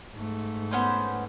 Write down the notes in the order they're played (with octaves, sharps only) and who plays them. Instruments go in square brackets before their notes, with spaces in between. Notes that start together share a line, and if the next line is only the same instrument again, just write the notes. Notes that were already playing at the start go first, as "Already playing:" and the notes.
[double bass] G#2 A3
[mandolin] B3 C#4 C5